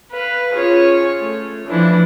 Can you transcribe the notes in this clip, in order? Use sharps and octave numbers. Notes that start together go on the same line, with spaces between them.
B4 F5
C#4 F4 G#4 C#5
A3
E3 F3 D4 E4